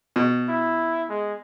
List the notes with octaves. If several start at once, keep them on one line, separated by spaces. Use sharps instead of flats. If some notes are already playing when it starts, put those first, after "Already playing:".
B2
E4
G#3